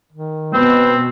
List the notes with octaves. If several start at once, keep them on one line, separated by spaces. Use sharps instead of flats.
D#3
B2 C4 B4